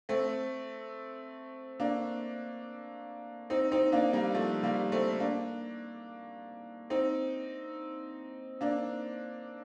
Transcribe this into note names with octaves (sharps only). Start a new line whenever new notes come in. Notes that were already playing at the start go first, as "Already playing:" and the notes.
A3 C4
A#3 D4
C4 D#4
C4 D#4
A#3 D4
G3 A#3
F3 A3
G3 A#3
A3 C4
A#3 D4
C4 D#4
A#3 D4